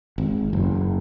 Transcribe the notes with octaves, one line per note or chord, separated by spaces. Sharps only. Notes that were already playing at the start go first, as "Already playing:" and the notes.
G#1
F#1